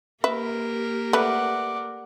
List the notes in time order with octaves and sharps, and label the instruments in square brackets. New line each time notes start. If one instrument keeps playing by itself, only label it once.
[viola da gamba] A#3 G4 A#4 [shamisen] B4 E5
[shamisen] A3 B4 [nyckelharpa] D5 F#5